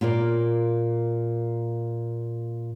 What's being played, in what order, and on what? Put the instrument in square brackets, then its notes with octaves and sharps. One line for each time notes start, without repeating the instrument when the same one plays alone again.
[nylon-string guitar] A#2 A#3 F4 D5